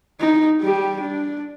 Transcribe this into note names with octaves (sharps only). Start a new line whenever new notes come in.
D#4
G3 G4
D4